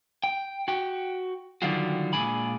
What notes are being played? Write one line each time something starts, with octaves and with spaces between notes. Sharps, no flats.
G5
F#4 G5
D3 D#3 F#3 G3 F4 F#4
A#2 G#3 D4 G#5 B5